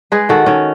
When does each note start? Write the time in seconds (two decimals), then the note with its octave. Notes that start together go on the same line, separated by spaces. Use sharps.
0.12 G#3 G#4 B4
0.29 D#3 F#4 A4
0.46 D#3 C#4